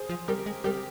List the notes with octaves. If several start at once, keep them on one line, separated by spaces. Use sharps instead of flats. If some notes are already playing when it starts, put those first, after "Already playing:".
Already playing: G#4 C5
F3
G3 G4 A#4
G#3
G3 G4 A#4